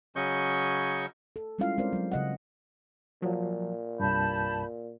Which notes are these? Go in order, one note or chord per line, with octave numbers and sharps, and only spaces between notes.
C#3 F#3 C#4 D#5 C#6 G6
A4
G3 G#3 C#4 E4 F4 F5
G#3 C4 C#4 A#4 C5 D5
F#3 G#3
C#3 D#5 F#5
A#2 F3 F#3
C2 G2 A5 B5 G6